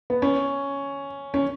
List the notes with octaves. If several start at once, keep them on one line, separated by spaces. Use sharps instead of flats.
B3
C#4
C#4